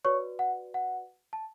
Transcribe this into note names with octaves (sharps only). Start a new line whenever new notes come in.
F#4 B4 C#5 D5 C#6
F#5
F#5
A5